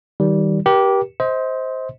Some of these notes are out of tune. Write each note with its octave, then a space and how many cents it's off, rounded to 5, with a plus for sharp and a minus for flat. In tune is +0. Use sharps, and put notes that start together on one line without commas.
D#3 +20 G3 -15
G4 -10 A#4 +40
C5 +0 D#5 +40